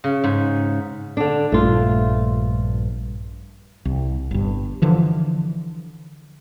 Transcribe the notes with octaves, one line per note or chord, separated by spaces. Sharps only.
C#3
G#2
D3 D4
A#1 G2 A3 F4
C2
G1 G2
D3 E3 F3